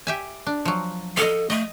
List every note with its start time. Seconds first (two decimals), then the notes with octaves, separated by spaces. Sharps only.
0.07 G4 E5 G#5
0.47 D4
0.65 F3 F#3
1.17 A4 D#5 F5
1.50 A3 D#5